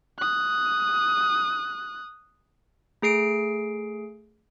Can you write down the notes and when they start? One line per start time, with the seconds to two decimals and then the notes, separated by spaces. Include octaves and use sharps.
0.19 D#6 F#6
3.02 A3 G#4 C7 D7